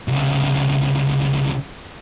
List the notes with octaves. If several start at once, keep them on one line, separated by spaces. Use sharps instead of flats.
C2 C#3